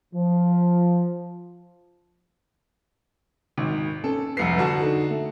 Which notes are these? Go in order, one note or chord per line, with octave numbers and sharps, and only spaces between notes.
F3
G#1 D#3
C#4 A4
F1 C2 B4 C7 C#7
D3 F#4 A5
D#4 A4
A3